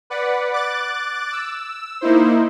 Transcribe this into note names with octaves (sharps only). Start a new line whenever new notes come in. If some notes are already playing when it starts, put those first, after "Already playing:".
B4 D5 F#5
D6 F#6 A6
E6
A#3 D#4 E4 C5